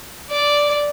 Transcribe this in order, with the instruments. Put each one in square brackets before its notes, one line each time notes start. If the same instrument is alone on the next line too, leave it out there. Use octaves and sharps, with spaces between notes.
[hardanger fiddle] D5